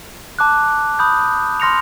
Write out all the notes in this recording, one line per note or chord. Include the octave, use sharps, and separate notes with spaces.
A5 D6 F#6
B5 D#6 G6
C6 F6 A#6 C#7 F7